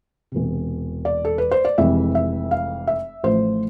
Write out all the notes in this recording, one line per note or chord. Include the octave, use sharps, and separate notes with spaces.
E1 E2 C3
D5
A4
B4
C5
D5
F1 F2 C3 E3 G#3 E5
E5
F5
E5
A1 A2 F3 A3 C5